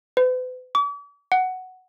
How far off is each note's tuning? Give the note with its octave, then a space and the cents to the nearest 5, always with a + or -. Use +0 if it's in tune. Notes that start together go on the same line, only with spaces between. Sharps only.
B4 +40
D6 -45
F#5 +5